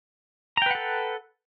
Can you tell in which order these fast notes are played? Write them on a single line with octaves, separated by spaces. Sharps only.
A#5 G5 B4 F#5 A4